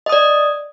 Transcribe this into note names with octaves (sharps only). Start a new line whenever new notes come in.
D5 D#5 D#6